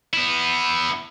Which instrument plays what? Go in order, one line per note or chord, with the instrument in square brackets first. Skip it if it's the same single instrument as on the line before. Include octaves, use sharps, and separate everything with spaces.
[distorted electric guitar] B3 E4